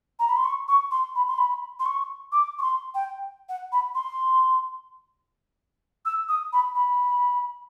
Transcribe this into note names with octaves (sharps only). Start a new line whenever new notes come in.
A#5
B5
C6
C#6
C#6
C6
B5
C6
B5
C6
C#6
D6
C#6
C6
G5
F#5
B5
C6
E6
D#6
B5
B5